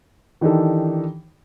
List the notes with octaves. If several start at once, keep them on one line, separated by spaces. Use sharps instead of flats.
D#3 E3 D4 D#4 G4 A4